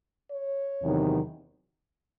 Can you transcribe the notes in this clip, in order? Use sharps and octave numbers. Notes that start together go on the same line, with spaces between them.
C#5
E2 C3 D#3 F#3